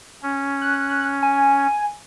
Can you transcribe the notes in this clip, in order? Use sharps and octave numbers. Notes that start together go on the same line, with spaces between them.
C#4
F#6
G#5